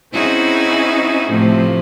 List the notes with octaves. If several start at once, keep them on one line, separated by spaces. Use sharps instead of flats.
C4 C#4 D#4 E4 F#4 G#4
A2 C3 F3 A3